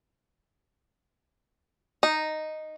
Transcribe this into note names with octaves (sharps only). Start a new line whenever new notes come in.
D#4